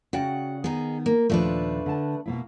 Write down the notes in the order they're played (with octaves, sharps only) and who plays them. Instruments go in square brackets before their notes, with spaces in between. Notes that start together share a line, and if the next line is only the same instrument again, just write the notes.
[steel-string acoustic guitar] C#3 F#5 [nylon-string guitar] F#4 D5 G5
[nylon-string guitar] D#3 B3 [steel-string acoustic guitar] D#4 G#4
[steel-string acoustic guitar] A#3
[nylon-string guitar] D#2 A#2 F3 [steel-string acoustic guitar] A3 D4 B4
[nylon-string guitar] D3 A5
B2 A#3 E4